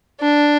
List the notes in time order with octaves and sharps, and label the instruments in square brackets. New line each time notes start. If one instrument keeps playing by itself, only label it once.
[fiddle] D4